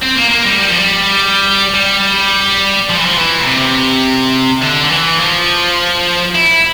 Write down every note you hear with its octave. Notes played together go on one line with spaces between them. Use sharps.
C4
A#3
A#3
G3
G3
F3
G3
G3
F3
E3
F3
E3
A#2
C3
D3
D3
E3
F3
E4